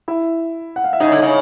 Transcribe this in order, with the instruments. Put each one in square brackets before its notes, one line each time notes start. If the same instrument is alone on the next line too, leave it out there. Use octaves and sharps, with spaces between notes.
[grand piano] E4 E5
F#5
F5
E5
[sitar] C#3 [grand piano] D#4 D#5
[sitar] D3
C#3